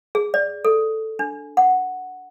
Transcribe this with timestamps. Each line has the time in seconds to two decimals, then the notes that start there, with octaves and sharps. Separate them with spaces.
0.15 G#4
0.34 D5
0.65 A4
1.19 D4
1.57 F#5